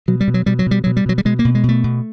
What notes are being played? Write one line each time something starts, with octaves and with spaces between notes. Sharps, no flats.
B2 F#3
G3
B2
F#3
B2 G3
F#3
B2 G3
B2 F#3
G3
B2 F#3
G3
B2 G#3
A#3
B2
G#3
B2
A3
B2